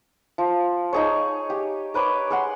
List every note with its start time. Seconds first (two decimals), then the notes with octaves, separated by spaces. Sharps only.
0.38 F3
0.93 D#4 G#4 C#5
1.50 G4
1.94 A#4 B4 C#5 D6
2.30 G#4 F#5 C6